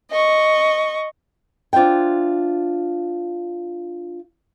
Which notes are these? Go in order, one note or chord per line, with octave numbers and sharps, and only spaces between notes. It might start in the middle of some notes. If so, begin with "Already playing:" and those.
D#5 C#6
D4 F4 C5 E5 G5